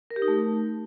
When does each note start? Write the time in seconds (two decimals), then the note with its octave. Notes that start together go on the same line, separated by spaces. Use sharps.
0.11 A#4
0.16 G4
0.22 D#4
0.28 A3